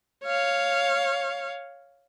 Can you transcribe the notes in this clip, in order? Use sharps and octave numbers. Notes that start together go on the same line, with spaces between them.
C#5 F5